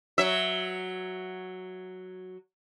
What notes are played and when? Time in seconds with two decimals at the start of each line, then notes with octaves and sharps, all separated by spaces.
0.18 F#3 E5